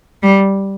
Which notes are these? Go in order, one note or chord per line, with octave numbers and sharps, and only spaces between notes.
G3